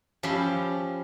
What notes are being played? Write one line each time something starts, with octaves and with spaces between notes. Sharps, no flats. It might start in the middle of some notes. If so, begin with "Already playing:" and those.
F3 C#4 G4 E5 B5 C6